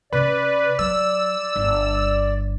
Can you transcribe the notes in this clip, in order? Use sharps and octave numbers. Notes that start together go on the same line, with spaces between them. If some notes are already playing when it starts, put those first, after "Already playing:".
C3 C#4 B4 D5
F#3 E6
G1